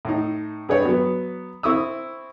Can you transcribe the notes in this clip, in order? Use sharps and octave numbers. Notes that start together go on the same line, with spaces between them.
A2 D#4
G2 G#4 B4 C#5 D5
F#3 B3
C4 E4 C#6 D#6 E6